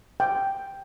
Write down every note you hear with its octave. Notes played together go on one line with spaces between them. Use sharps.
G5